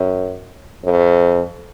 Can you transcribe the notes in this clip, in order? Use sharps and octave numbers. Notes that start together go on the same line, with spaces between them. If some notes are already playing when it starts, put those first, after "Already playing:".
Already playing: F#2
F2